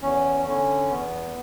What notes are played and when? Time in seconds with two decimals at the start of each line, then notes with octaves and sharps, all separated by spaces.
0.02 E2 C#4
0.46 D3 C#4
0.90 E2 B3